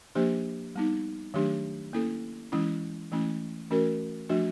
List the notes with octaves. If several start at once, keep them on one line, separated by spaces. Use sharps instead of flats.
F3 A#3 D4 G4 C5
G3 B3 D#4
D#3 F#3 A3 D4 G4
A#3 C#4 E4 A4
E3 G#3 C#4 E4
E3 A3 C#4 E4
E3 A3 C#4 F#4 A#4
F3 A3 D4 F#4